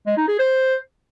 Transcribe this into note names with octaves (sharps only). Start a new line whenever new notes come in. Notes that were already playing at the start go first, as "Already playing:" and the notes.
G#3
D#4
G#4
C5